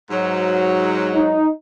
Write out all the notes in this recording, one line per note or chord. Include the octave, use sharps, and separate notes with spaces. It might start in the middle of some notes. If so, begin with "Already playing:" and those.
G#2 F#3
D#4